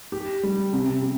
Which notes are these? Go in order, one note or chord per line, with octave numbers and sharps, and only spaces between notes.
G4
G3
C3
C3